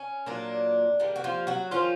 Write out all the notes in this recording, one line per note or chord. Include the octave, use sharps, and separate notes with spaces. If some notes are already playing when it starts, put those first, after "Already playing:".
Already playing: C#4
A#2 F#3 A#3 D4
D#3 G3 A#3
F#4
F3 F4
F#3 F#4
D#3 F3 C#4 F4